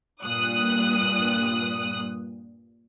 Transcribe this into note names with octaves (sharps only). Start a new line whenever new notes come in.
G2 A#2 D#6 F#6